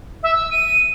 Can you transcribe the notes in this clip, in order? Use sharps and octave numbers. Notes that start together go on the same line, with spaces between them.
E5
E6
D#7